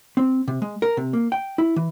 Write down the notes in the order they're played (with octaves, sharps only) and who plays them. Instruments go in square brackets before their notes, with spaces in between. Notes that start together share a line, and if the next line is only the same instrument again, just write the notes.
[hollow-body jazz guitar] C4
C3
G#3
A#4
C3
A#3
G5
E4
E3